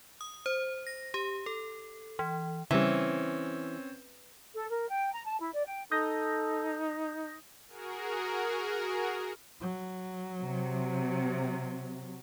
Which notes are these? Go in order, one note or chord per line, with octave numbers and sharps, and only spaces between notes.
D#6
C5
A#6
G4
A4
E3
C#3 E3 G3 C4 C#4
A4
A#4
G5
A#5
A5
E4
D5
G5
D#4 A4 D#6 G6 A#6
F#4 G#4 A#4
F#3
C3